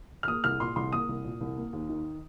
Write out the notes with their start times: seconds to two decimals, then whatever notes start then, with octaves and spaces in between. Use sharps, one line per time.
0.23 F6
0.27 A#3 D#6
0.44 C2 F6
0.60 A#2 C6
0.76 C2 C6
0.93 A#3 D#6
1.09 C2
1.25 A#2
1.41 C2
1.57 A#3
1.73 D#2
1.89 D#3